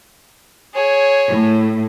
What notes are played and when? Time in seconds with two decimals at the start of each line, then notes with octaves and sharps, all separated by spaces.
0.74 G#4 C#5
1.29 A2